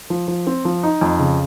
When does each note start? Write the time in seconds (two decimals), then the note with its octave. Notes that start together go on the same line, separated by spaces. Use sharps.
0.10 F3
0.28 F3
0.47 C4
0.65 F3
0.83 D#4
1.01 F2
1.19 C#3